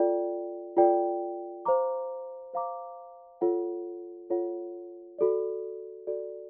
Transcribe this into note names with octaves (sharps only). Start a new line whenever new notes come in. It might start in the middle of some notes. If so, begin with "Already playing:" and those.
Already playing: F4 A4 D5 G5
F4 A4 D5 G5
C5 F5 A#5 D6
C5 F5 A#5 D6
F4 A4 C#5 F#5
F4 A4 C#5 F#5
F#4 A4 D5
F#4 A4 D5